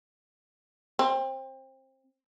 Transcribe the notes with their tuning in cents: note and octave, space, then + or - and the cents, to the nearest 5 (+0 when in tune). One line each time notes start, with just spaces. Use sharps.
C4 +25